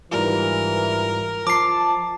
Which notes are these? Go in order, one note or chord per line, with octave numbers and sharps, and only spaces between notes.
G#2 E3 G3 F4 A#4
F3 A5 D6 C7